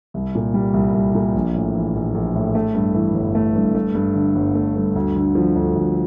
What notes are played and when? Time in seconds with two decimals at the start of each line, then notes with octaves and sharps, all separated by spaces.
0.14 C2
0.35 A#2
0.54 G3
0.74 C2
0.94 C2
1.14 A#2
1.35 A#1
1.54 A2
1.75 E3
1.95 A#1
2.14 A#1
2.35 A2
2.55 A3
2.74 G2
2.94 E3
3.14 G1
3.35 A3
3.56 G2
3.75 A3
3.95 G2
4.15 D3
4.35 G1
4.55 A3
4.76 G2
4.95 D2
5.16 D3
5.35 F3
5.55 D2
5.75 D2